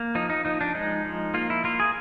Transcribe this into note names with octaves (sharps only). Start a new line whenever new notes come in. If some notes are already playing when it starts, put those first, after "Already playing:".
Already playing: A#3
F3 D#4
D#4
F3 D#4
D4
G#3 D#4
F3
A#3 F4
E4
A#3 F4
G#4